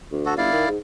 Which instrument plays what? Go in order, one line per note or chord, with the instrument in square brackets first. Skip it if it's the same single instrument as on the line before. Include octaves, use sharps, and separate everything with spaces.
[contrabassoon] D2
[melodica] F#4 A4
[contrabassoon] G1 [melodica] E4 D5 F5
[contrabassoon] D#3
G#2